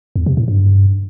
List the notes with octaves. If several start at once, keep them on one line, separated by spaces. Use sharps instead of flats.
E2
C3
A2
G2